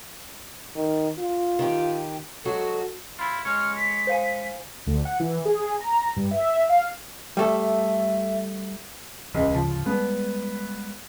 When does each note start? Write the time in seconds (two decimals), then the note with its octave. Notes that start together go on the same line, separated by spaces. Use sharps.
0.75 D#3
1.18 F4
1.59 D#3 G4
2.45 F#3 G#3 F#4 A4
3.19 E4 F4 B5
3.45 G#3 C#5 F6
3.77 B6
4.07 C5 F5 G#5
4.87 D2
5.05 F#5
5.20 E3
5.45 G#4
5.81 A#5
6.16 G2
6.31 E5
6.69 F5
7.37 G3 A3 A4 E5
9.34 D#1 C#2 E3
9.54 D2 G#2 C#3 F3
9.86 G3 G#3 B3